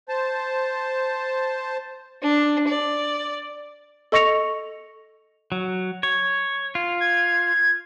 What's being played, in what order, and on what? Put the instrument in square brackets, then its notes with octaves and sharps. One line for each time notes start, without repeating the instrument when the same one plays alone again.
[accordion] C5 A5
[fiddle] D4
D5
[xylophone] A4 D#5 C#6 A#6 C#7 F7
[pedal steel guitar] F#3
C#5
F4
[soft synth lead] G#6